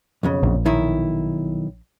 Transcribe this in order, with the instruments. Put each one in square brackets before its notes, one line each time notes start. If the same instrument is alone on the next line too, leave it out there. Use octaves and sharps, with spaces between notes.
[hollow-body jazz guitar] B1 F2 C#3
[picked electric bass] A#1
[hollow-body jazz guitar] B1 D#3 E4